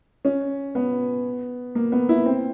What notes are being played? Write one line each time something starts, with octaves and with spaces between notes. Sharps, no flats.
C#4
B3
A#3
B3
E4
C4